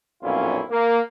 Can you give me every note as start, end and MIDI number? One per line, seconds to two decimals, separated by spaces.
0.23 0.63 35
0.23 0.63 41
0.23 0.63 46
0.23 0.63 61
0.23 0.63 64
0.23 0.63 65
0.70 0.99 58